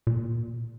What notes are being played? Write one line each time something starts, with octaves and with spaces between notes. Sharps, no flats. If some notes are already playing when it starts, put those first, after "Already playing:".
A#2